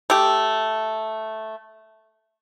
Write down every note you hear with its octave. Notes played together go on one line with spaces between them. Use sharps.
A3 G4